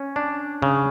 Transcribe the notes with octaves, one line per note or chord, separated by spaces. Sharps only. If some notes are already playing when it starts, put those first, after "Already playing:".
Already playing: C#4
D4
C#3